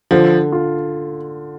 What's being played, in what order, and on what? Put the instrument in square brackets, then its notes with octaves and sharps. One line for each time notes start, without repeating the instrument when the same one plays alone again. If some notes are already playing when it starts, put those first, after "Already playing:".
[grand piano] D3 [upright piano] F3
[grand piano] F4